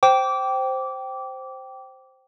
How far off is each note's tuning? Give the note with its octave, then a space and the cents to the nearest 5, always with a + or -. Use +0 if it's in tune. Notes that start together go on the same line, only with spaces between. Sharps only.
C5 +0 G5 -15 D6 -20